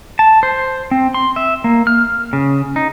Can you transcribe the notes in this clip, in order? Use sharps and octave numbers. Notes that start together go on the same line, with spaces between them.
A5
C5
C4
C6
E5
A#3
F6
C#3
D#4